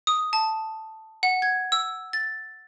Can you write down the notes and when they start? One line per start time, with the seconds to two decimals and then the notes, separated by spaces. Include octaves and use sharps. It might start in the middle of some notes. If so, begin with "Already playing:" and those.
0.07 D#6
0.33 A5
1.23 F#5
1.42 G#6
1.72 E6
2.13 A6